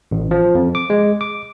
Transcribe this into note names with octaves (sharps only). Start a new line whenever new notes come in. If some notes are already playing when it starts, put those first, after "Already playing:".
A1
F3
F2
D6
G#3
D6